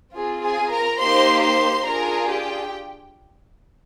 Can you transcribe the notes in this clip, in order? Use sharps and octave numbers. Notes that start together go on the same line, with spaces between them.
C4 F4 G#4
G#4 G#5
A#4 A#5
A#3 D#4 G4 C5 C6
C5 C6
D4 F4 G#4 A#4 A#5
G4 G5